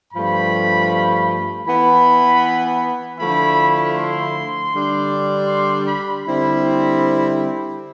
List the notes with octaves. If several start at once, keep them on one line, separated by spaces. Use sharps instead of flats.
G2 F3 A3 B5
E3 B3 E4 B5
D3 F3 A3 E4 B5
C6
D3 G3 D4
C6
B5
D3 G3 C4 E4 B5